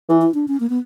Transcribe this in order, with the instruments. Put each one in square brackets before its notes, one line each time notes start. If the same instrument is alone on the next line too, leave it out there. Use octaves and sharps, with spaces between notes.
[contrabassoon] E3 [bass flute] E4
[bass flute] E4
D4
C#4
A#3
B3